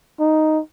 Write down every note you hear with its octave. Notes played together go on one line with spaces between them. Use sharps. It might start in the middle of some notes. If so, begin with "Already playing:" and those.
D#4